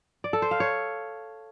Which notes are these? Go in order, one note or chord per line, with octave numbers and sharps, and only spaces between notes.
D5
A4
C5
F5
C#5